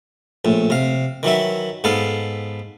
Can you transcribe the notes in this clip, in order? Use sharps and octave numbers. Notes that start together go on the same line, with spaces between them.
A#1 A2
C3 F5
D#3 E3 F#3 E5
G#2 B3 A4 F5